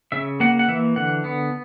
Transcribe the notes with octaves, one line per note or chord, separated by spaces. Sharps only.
C#3 E5
A#3 F#5
F#5
E3 E5
D3 F#5
B3